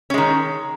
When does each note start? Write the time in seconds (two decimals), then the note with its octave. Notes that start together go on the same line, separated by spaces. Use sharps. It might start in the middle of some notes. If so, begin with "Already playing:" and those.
0.10 C#4
0.14 G#3
0.18 D#3